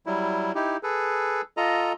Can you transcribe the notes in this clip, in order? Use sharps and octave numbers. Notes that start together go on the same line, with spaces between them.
F#3 G3 E4
D#4 E4 G4
G#4 A4 B4
F4 A4 D#5 A#5